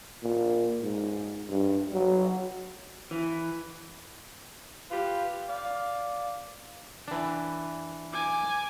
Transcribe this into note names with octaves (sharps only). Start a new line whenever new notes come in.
A#2
G#2
G2
F#3
E3
F4 G4 B4
D5 F5
E3 D4
G#5 D6